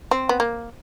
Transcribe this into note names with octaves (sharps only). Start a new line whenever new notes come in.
C4
B3
A#3